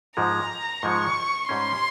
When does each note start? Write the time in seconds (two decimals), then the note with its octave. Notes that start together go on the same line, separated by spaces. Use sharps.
0.16 G#2 F3 G#3 A#5
0.83 G#2 F3 G#3 C#6
1.49 G#2 G3 C#4 C6